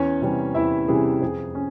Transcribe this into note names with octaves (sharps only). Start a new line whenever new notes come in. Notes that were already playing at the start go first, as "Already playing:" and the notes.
Already playing: E2 C#4 C#5
C3 E3 G3 C#4
E2 E4 E5
C3 E3 G3 C#4 G#4
F2 G#4
C#4